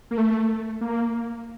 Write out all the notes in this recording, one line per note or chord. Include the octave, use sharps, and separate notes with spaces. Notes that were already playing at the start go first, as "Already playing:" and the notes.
A#3
A3
A#3